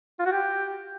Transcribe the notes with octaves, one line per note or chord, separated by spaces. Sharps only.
F4
F#4
G4